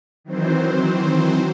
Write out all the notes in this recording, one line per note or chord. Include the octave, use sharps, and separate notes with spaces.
D#3 E3 F#3 C4 C5